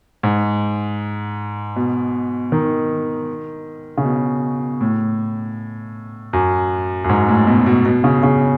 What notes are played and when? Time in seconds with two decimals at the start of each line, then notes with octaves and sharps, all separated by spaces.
0.23 G#2
1.76 B2
2.52 D#3
3.98 C#3
4.05 B2
4.81 A2
6.33 F#2
7.04 F#2
7.09 G#2
7.28 A2
7.47 B2
7.66 B2
7.85 B2
8.04 C#3
8.23 C#3